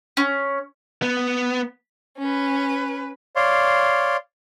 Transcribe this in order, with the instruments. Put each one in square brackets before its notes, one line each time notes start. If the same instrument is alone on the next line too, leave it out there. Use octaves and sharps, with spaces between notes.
[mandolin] C#4
[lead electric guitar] B3
[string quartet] C#4 B4
[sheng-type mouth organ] C#5 D5 F5 C6